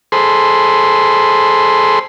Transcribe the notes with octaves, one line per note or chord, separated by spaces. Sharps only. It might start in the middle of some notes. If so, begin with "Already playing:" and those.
G#4 A4 C5 B5 C6